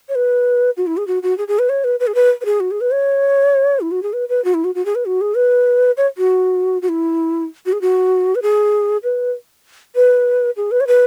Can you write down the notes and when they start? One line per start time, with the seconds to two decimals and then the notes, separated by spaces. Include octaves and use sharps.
0.09 C#5
0.15 B4
0.77 F#4
0.87 E4
0.97 G#4
1.07 F#4
1.23 F#4
1.38 G#4
1.48 G#4
1.59 B4
1.69 C#5
1.84 B4
2.00 B4
2.07 G#4
2.15 B4
2.41 B4
2.45 G#4
2.60 F#4
2.71 G#4
2.81 B4
2.91 C#5
3.81 E4
3.91 F#4
4.03 G#4
4.13 B4
4.29 B4
4.44 F#4
4.54 E4
4.64 F#4
4.75 F#4
4.85 G#4
4.95 B4
5.06 F#4
5.21 G#4
5.36 B4
5.97 C#5
6.18 F#4
6.82 F#4
6.89 E4
7.66 F#4
7.73 G#4
7.81 F#4
8.35 B4
8.42 G#4
9.03 B4
9.95 B4
10.57 G#4
10.71 B4
10.80 C#5
10.87 B4